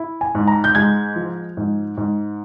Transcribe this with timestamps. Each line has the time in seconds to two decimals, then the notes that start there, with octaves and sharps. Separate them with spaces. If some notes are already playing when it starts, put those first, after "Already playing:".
Already playing: E4
0.21 G#5
0.35 G#2
0.48 A#5
0.64 G6
0.75 G#3 G#6
1.16 F3
1.57 G#2
1.97 G#2